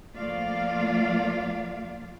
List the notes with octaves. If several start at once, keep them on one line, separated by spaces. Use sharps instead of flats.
F3 A3 A#3 F4 D5 F5